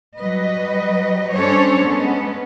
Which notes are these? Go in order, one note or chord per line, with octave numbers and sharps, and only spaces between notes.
F#3 G3 B4 D#5
G3 C#4 D4 A4 C5 C#5
G#3 B3 C#4